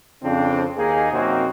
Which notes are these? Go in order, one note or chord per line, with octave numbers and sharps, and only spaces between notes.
F2 C#3 C4 D4
D#2 A#3 D#4 G#4
F#2 C3 A#3 C4 D#4 F#4